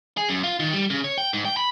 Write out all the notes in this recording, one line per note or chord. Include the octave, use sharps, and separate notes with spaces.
G#4
F#2
F4
D#3
G3
C#3
C#5
G5
G#2
G5
B5